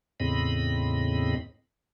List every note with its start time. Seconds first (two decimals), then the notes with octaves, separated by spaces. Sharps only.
0.20 E2 A2 C#3 C4 D#5 B5